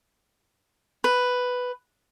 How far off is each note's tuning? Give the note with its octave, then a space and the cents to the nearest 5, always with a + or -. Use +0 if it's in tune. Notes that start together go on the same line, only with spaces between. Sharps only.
B4 +5